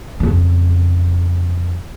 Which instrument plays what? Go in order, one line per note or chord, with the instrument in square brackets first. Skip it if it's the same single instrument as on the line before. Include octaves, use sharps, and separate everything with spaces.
[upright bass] F2 C#3